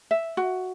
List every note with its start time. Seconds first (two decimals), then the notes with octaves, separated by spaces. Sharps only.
0.11 E5
0.37 F#4